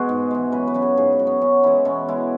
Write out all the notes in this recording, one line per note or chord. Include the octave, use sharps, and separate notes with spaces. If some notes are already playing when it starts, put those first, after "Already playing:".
Already playing: B2 G#3 F#4 G#4
G#2
E3 G#3
F#2 B4
B4
C#3 F#3
G#4
G#2 G#4
F#4
F#3
B3
F#2 C#4
E3 G#3 E4
B2 C#4
G#3 E4